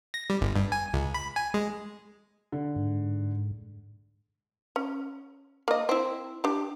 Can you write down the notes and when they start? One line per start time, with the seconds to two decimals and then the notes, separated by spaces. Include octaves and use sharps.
0.14 A#6
0.30 G3
0.41 G1
0.56 G2
0.72 G#5
0.94 C#2
1.14 B5
1.36 G#5
1.54 G#3
2.52 D3
2.76 G#2
4.76 C#4
5.68 A#3 D#5
5.89 C4 E4
6.44 D4 G4